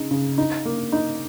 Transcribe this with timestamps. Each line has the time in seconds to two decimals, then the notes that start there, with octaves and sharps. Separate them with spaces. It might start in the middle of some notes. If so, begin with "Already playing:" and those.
Already playing: C#3 D#4
0.11 C#3
0.38 D#4
0.65 A#3
0.92 D#4